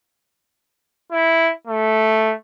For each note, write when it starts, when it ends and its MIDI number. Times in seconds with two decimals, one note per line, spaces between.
1.12 1.52 64
1.67 2.34 57